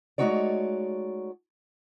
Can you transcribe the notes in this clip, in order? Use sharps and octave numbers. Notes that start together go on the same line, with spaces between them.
G#3 A3 D#4 F#4 C#5 D5